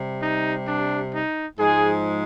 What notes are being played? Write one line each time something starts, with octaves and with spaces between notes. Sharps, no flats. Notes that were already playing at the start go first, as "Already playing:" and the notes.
Already playing: C3 G3
D#4
D4
D#4
G#2 F3 G#3 G#4